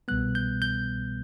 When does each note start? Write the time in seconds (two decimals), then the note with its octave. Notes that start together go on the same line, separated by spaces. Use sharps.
0.08 C2 B2 G3 B3 F#6
0.35 G6
0.62 G6